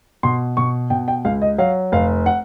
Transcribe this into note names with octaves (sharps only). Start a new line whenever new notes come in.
B2 C6
B2 C#6
B2 G5
G5
C#2 F5
D#5
F#3 F5
F1 F5
F#5